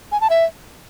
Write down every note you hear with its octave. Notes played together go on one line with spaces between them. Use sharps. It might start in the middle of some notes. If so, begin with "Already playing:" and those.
G#5
A5
E5